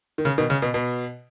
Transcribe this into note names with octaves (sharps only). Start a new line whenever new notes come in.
D#3
C#3
B2 D#3
C#3
B2
B2